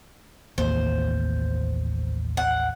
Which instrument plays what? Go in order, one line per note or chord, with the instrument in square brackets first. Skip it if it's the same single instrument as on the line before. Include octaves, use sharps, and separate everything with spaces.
[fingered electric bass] A1 D#2 A#3 [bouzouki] C5
[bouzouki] F#5